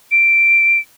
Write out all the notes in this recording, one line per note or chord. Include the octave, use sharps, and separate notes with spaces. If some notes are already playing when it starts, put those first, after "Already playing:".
D7